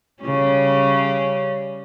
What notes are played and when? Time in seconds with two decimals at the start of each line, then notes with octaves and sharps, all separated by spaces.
0.23 C#3 G3 C#4